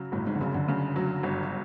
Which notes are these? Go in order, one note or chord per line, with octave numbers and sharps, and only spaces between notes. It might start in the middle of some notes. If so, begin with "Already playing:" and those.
Already playing: C#3 F#3
G1 A2
G#2
D3
F#2 C#3
D3
C#3
F#3
G1